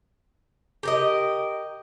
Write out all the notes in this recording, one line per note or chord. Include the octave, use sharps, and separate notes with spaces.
G4 A#4 D#5